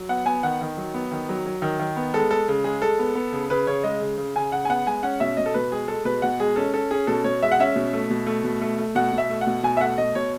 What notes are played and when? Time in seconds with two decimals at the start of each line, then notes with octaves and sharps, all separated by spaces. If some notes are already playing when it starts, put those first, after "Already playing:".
Already playing: F#3
0.09 B3 F#5
0.26 B3 G#5
0.43 D#3 F#5
0.61 D#3
0.77 F#3
0.94 B3
1.11 D#3
1.29 F#3
1.46 F#3
1.62 D#3
1.79 D#3
1.96 B3
2.13 G#3 A4
2.31 G#3 A4
2.48 C#3
2.64 G#3 G#4
2.82 G#3 A4
2.99 B3
3.15 B3
3.33 C#3
3.50 C#3 B4
3.67 C#3 C#5
3.83 G#3 D#5
4.01 C#3
4.18 C#3
4.36 C#3 G#5
4.52 C#3 F#5
4.65 G#5
4.69 B3 F#5
4.87 G#3 G#5
5.03 C#4 F#5
5.20 B2 E5
5.37 B2 D#5
5.46 A4
5.54 B2 B4
5.71 G#3 G#4
5.88 G#3 A4
6.05 B2 B4
6.22 B2 F#5
6.40 G#3 G#4
6.56 C#4 A4
6.74 C#4 A4
6.91 C#4 G#4
7.07 B2 A4
7.24 B2 C#5
7.42 G#3 E5
7.52 F#5
7.60 C#4 E5
7.76 B2
7.93 A3
8.10 B2
8.27 A3
8.44 B2
8.61 A3
8.78 A3
8.95 B2 F#5
9.13 B2
9.18 E5
9.30 A3
9.41 F#5
9.47 B2
9.63 B2 G#5
9.77 E5
9.80 A3 F#5
9.98 B2 D#5
10.15 B2 C#5